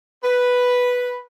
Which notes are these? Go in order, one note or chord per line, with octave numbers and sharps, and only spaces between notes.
B4